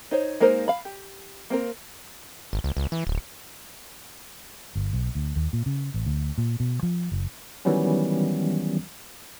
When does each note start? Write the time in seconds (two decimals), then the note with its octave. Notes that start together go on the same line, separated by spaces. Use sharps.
0.11 D#4 C5 C#5
0.40 G#3 A#3 D#4 A#4 C5
0.68 F5 B5
0.85 G4
1.50 A#3 C4 A#4
2.53 G#1
2.64 C#2
2.77 C#2
2.92 E3
3.07 D1
4.75 G1
4.93 B1
5.15 D2
5.36 D#2
5.53 A#2
5.66 C#3
5.94 A1
6.06 D2
6.38 A#2
6.60 B2
6.83 F3
7.12 F#1
7.65 D#3 E3 F#3 G3 B3 C#4